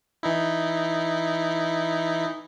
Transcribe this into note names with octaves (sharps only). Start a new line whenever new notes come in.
E3 D#4 E4